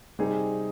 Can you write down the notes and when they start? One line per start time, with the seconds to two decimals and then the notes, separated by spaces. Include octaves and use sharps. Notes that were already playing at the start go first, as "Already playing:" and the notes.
0.19 C3 G3 C4 D#4 G#4